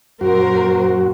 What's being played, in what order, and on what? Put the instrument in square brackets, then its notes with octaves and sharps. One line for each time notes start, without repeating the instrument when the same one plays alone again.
[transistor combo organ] F#2 F#4 [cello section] A#2 A#4 C5